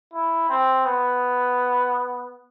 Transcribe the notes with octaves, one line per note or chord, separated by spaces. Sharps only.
E4
C4
B3